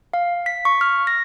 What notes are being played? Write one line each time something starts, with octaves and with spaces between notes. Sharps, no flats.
F5
B6
C#6
F6
A#6